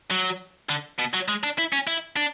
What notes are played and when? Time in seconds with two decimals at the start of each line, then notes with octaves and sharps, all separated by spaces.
0.11 F#3
0.69 D3
0.99 B2
1.14 F#3
1.28 G#3
1.43 D4
1.58 E4
1.73 C#4
1.87 E4
2.16 D4